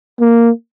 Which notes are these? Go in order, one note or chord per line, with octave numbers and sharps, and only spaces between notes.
A#3